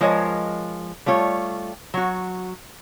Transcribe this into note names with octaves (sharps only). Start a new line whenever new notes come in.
F3 G#3 A#4 C#5 D#5
G3 A3 F4 C#5
F#3 F#4